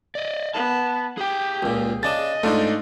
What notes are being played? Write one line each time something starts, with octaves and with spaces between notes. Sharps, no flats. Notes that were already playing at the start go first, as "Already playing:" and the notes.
D5 D#5
B3 A5
G4 G#4 G5
C#2 A#2
C#3 D4 D#5 A5 A6
G#2 A3 D4 D#4 F4